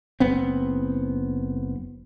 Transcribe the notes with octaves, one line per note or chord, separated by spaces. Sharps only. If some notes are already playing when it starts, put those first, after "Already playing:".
F#1 B3 C4